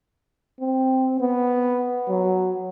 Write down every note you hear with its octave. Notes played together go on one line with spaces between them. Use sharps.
C4
B3
F#3